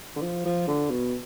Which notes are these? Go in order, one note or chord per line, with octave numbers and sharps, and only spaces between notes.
D3
F3
F3
D3
B2